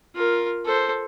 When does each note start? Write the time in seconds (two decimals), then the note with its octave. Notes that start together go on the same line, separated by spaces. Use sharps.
0.15 F4 A#4
0.65 A4 C5